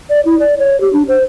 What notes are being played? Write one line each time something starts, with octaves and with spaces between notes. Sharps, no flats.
D5
E4
D5
C#5
G4
D4
C5